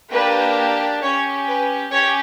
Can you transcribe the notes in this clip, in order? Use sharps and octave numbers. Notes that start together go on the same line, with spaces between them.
A#3 D4 G4 B4
C#4 G4 C#5
B4
C#4 G4 C#5